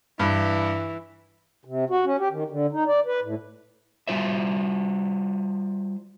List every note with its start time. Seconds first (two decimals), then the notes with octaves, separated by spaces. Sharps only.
0.19 G2 E3
1.65 C3
1.90 F#4
2.05 C#4
2.19 G4
2.31 D#3
2.50 D3
2.72 D#4
2.87 D5
3.06 B4
3.22 A2
4.07 G3 G#3 F4 C5 E5